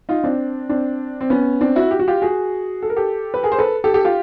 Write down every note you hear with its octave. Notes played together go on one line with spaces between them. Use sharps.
D#4 F4
C4 D4
C4 D4
C4
B3 C#4
C4 D4
E4 F#4
G4
F#4
F4 G4
F#4 G#4
A4
A#4
G4 A4
B4
G#4 A#4
C5
A4 B4
G4 A4
G4 A4
F4 G4